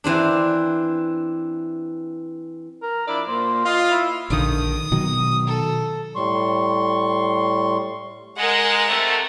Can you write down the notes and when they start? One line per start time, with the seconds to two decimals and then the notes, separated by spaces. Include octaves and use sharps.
0.04 E3 C4 D4
2.83 A#4
3.08 F3 D4 E4 D5
3.28 A#2 A#3 C5
3.65 F4 D#5
3.91 E4
4.30 A#1 D3 D#3 D#6
4.92 B2 D#3 F#3
5.47 A4
6.15 A2 G3 C6 C#6
8.37 G#3 A#4 F#5
8.87 C3 A3